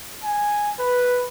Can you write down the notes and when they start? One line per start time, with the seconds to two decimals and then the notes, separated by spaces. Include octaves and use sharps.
0.24 G#5
0.79 B4